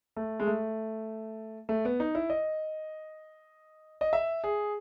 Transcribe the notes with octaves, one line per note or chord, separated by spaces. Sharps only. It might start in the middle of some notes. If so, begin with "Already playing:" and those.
A3
G#3
A3
A3
B3
D#4
E4
D#5
D#5
E5
G#4